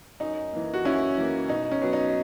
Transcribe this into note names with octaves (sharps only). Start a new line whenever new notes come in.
F#2 D#4
E3 A#3
F#4
F#2 C#4 E4
E3 A#3
B2 D#4
C#4
F#3 B3
D#4